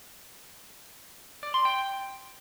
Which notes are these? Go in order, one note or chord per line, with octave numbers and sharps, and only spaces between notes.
D5
C6
G5